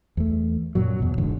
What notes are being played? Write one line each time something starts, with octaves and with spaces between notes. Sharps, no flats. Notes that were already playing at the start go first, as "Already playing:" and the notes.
E2 A3
F#2 A#2 F#3
E2 B2
E1 G#2 D3